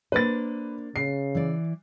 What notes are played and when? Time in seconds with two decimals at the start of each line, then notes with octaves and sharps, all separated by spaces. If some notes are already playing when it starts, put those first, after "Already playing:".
0.12 A#3 D4 B4 C5 A6
0.96 C#3 C7
1.35 E3 D5